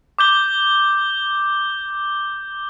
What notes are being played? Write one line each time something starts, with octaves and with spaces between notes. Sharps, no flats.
D6 G6 G7